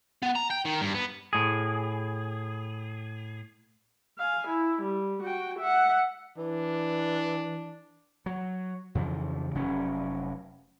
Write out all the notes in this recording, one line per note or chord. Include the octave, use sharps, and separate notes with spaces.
B3
A#5
G5
D#3
G2
B3
A2 G#4
F5 G#5
E4
G3
F#4 G5
E5 F#5
E3 D4
F#3
F2 C#3 E3 F3
F1 F#3 C#4